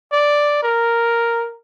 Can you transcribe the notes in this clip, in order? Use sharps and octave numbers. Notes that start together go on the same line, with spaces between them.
D5
A#4